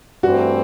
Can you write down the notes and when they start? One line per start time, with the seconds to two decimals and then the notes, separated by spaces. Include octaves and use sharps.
0.23 G2 E3 A3 C4 F#4